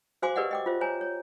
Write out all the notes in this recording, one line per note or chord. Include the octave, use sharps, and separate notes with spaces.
F#4 C5 F5 G#5 C6 D6
G4 A#4 B4 D5 D#5 F#5
D#5 G5 D6
F4 C5 E5
C5 C#5 G#5 A#5
C#5